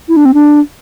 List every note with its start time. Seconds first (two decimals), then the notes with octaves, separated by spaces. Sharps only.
0.09 E4
0.17 D4
0.25 C4
0.34 D4